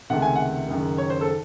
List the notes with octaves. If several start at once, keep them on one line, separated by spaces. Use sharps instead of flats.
C#2 C3 D#3 A3 F#5
G#5
F#5
F#1 F#2 D#3
C#5
C5
A4